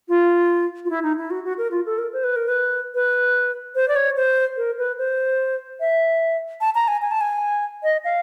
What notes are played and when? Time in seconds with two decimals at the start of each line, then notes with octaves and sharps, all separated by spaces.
0.08 F4
0.85 F4
0.90 E4
1.03 D#4
1.18 E4
1.30 F#4
1.44 F#4
1.58 A#4
1.71 F4
1.86 A4
1.98 A#4
2.13 C5
2.24 B4
2.36 A#4
2.48 B4
2.94 B4
3.75 C5
3.88 D5
3.96 C#5
4.16 C5
4.57 A#4
4.78 B4
4.98 C5
5.80 E5
6.61 A5
6.75 A#5
6.88 G#5
7.02 G#5
7.11 A5
7.21 G#5
7.83 D#5
8.05 F5